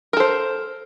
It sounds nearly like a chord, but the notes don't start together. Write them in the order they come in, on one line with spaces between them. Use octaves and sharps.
A#4 A4 C5